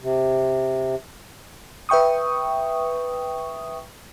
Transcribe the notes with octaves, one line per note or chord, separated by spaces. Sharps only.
C3
B4 E5 G5 C#6 D#6